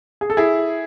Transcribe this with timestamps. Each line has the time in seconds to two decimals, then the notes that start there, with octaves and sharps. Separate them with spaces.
0.21 G#4
0.30 A4
0.37 E4 G#4